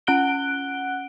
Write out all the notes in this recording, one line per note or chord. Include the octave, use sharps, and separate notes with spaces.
C#4 F#5 F#6 D7 G7